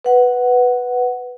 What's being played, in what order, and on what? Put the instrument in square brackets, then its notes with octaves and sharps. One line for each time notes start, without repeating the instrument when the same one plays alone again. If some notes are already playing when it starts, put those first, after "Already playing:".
[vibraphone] B4 F#5